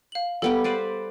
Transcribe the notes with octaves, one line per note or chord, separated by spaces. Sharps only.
F5 F#7
G3 B3 G4 A4
B4 C5 D5